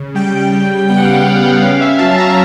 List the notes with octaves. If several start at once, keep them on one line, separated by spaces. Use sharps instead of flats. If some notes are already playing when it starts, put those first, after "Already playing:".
Already playing: C#3
G3 G5
G3
B3 G5
F#5
F5
F#5
B3 F5
C#4 F5
E5
F#3 A5
A#5